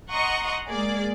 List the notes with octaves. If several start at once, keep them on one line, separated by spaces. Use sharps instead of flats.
D#5 F#5 A#5 C6 C#6 D#6
G#3 A#3 G#4 D5